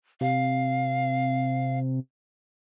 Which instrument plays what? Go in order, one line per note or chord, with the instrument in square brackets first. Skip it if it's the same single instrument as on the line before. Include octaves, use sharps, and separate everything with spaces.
[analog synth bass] C3 [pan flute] F5